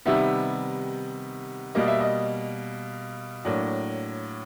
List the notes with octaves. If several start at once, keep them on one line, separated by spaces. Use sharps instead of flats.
C3 D#3 G3 B3 E5
B2 G3 A#3 D#5
E5
D#5
A2 F#3 A#3 D4